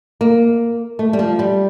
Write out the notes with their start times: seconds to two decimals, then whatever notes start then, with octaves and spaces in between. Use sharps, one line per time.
0.21 A#3
0.99 A3
1.13 G3
1.19 F3
1.39 G3